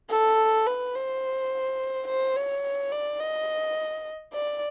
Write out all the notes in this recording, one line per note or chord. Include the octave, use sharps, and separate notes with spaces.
A4
B4
C5
C5
C#5
D5
D#5
D5